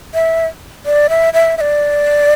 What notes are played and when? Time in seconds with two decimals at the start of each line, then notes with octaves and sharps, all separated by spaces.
0.14 E5
0.86 D5
1.10 E5
1.33 E5
1.57 E5
1.61 D5